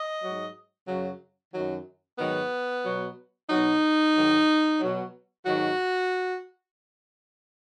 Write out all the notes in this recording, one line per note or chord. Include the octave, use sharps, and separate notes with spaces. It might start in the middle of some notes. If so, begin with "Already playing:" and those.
Already playing: D#5
G#2 F#3
F#2 C#3 F#3
F#2 D#3 F#3
G#2 D#3 F#3 B3
B2 F#3
B2 F#3 D#4
G#2 D#3 F#3
B2 F#3
G#2 D#3 F#3 F#4